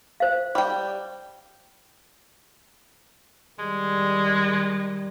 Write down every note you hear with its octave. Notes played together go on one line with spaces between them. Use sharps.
C5 F5
G3 G5
D#3 G3 G#3